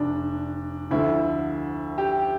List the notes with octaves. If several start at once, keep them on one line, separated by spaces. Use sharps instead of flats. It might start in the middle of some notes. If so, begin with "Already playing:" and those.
Already playing: F1 D4
D2 D3 F3 E4
G4